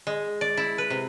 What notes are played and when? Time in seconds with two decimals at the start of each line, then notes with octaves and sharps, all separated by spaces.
0.07 G#3
0.41 D5
0.57 E4
0.78 B4
0.90 C3